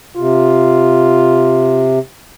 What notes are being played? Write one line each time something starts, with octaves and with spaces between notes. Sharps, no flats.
C3 F4